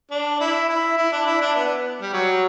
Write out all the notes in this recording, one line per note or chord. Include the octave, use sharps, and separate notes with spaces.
D4
E4
E4
E4
D4
E4
D4
B3
G3
F#3